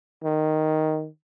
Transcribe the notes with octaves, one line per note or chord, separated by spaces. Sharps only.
D#3